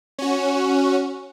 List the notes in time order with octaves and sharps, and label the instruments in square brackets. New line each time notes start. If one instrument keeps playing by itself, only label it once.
[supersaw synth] C#4 F#4